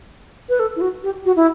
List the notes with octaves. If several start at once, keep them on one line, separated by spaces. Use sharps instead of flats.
B4
A4
E4
F#4
G4
F#4
E4